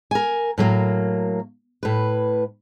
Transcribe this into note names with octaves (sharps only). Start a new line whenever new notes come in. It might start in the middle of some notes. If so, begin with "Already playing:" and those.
A#4 G#5
A2 F#3 A#3
A2 B4